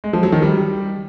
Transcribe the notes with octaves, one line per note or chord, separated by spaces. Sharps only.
G#3
F3
F#3
D#3
G3